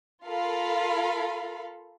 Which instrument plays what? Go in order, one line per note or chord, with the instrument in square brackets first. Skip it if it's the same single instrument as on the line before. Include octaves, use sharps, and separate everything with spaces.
[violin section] F4 A4 A#4 F5 B5